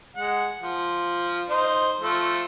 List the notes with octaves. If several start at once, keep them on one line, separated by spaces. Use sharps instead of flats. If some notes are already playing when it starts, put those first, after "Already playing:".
G#3 F#5
F3
D#4 C5
F3 A3 A4